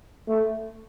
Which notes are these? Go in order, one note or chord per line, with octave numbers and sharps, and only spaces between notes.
A3